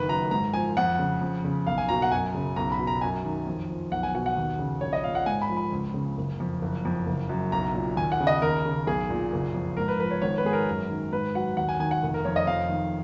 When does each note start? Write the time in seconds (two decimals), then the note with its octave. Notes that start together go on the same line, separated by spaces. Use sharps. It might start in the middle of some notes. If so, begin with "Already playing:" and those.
Already playing: F#1 D#3 B4
0.09 F#2 A#5
0.31 G#2 A#5
0.54 F3 G#5
0.77 F2 F#5
0.99 C#3
1.21 F2
1.45 C#3
1.67 B1 F5
1.78 G#5
1.89 B2 A#5
2.02 F#5
2.11 F#2 G#5
2.34 C#3
2.56 B1 A#5
2.72 B5
2.79 B2
2.87 A#5
3.01 F#2 G#5
3.25 D#3
3.47 F2
3.70 F3
3.91 B1 F#5
4.03 G#5
4.14 B2 F#5
4.26 F#5
4.37 D#2
4.59 C#3
4.81 A#1 C#5
4.93 D#5
5.04 A#2 F5
5.15 F#5
5.26 G#2 G#5
5.42 B5
5.49 F3
5.57 B5
5.72 C#2
5.94 C#3
6.18 F#1
6.40 F2
6.62 F#1
6.85 F2
7.07 F#1
7.29 F#2
7.52 B1 A#5
7.74 A#2
7.96 D#2 G#5
8.12 F#5
8.20 C#3
8.27 D#5
8.42 D#2 A#4
8.65 C#3
8.87 B1 G#4
9.10 A#2
9.33 F#1
9.54 F2
9.77 G#2 A#4
9.88 B4
9.99 F3 B4
10.11 C#5
10.22 G#1 C#5
10.38 B4
10.44 G#2 G#4
10.53 A#4
10.68 F#2
10.90 D#3
11.12 G#2 B4
11.35 F#3 F#5
11.57 D#2 F#5
11.69 G#5
11.80 D#3 G#5
11.91 F#5
12.03 F1
12.14 A#4
12.25 F2 C#5
12.36 D#5
12.47 F2 F5
12.69 D#3